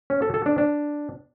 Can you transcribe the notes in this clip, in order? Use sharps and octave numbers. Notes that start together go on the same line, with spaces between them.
C#4
A4
A4
D4
D4